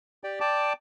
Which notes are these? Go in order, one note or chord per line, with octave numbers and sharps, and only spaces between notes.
G4 D5 G5
D5 G5 A5 D6